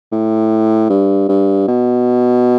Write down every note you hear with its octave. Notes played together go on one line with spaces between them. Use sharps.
A2
G2
G2
B2